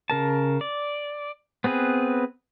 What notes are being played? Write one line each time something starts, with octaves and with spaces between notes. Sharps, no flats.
C#3 A#4 A5
D5
B3 C4 G#4 B4